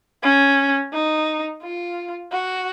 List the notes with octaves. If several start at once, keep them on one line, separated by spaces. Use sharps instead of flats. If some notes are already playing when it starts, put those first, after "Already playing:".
C#4
D#4
F4
F#4